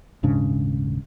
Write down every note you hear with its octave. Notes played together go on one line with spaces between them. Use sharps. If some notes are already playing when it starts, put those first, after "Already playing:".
D#1 G#2 C#3 D4